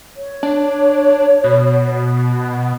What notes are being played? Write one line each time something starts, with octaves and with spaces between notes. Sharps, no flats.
C#5
D4
B2